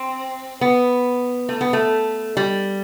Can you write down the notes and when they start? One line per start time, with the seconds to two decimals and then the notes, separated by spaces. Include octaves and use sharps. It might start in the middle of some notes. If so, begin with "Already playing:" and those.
Already playing: C4
0.61 B3
1.49 A3
1.61 B3
1.73 A3
2.37 G3